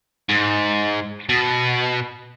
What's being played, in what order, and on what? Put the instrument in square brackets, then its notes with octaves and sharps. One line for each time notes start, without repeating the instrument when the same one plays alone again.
[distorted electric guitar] G#2
B2